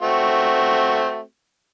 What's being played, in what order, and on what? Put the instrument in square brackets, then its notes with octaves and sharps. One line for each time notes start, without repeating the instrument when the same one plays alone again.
[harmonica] A3 C4 F#4